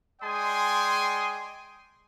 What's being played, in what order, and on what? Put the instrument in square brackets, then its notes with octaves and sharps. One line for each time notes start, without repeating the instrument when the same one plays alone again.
[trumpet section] G#3 D5 G5 G#5 C6 D#6